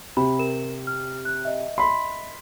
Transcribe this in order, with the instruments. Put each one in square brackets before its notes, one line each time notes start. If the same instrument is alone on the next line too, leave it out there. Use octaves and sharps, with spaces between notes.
[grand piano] C3 [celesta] B5
[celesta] A#4 E7
F6
F#6
D#5 E5
[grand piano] B5 C6